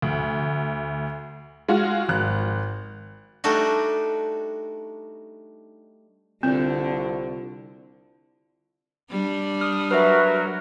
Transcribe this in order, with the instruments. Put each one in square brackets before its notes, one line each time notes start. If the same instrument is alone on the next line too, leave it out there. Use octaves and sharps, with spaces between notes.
[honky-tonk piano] D2
G#3 F4 F#4
G#1 F#6
[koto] G3 A3 D4 D#4 F#4
[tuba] C2 [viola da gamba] D3 [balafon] C4 [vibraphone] F4
[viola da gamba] G3 D4
[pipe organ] D#6 [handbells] F6
[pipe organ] F#3 F#4 A#4 [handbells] B4 E5